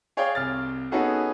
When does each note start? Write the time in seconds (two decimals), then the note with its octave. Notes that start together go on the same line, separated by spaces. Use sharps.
0.17 G#4 C#5 D5 F5 G5
0.35 C2 F6 A6
0.91 B3 C#4 D#4 F#4 G#4 A4